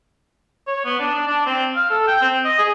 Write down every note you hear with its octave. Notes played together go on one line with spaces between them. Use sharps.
C#5
B3
D4
D4
D4
C4
F5
A4
G5
C4
D#5
G#4